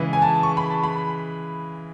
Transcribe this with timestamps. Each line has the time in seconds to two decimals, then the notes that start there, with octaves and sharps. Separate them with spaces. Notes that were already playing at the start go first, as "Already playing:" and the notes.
Already playing: C#3 E3 G#3
0.13 G#5
0.22 A5
0.43 C#6
0.57 B5
0.70 A5
0.84 B5